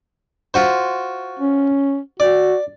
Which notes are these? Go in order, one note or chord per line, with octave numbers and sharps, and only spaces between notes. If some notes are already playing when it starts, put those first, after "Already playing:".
F4 F#4 C5
C#4
F#4 D5